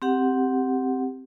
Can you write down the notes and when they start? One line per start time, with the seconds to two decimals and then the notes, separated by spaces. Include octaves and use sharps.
0.02 C4 G4 F#5